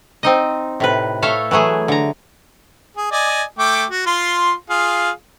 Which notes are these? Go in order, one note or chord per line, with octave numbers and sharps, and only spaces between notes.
C4 D#4 D#5
A2 C3 B4
A3 A4 C#5 E5 F5
E3 F#3 A3 G#4
D3 A#5
G#4
D5 D#5 G#5
A3 G5 D6
F#4
F4 C6
F4 G#4 F5